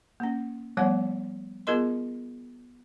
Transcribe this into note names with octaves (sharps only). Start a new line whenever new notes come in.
A#3 C#4
F3 G3 A3 B3 C#5 F#5
B3 F4 G#4 A#4 D#5 C6